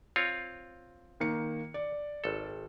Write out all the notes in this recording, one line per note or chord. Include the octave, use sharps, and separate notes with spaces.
C4 F4 C#5
D#3 A#3 C#7
D5
G#1 A4